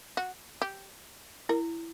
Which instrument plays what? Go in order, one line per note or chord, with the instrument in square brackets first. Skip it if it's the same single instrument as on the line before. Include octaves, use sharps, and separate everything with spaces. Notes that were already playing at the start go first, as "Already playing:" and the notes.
[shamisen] F#4
G4
[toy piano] E4 [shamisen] A#4